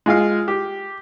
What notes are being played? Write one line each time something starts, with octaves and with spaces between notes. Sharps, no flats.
G#3 F4 F5
G4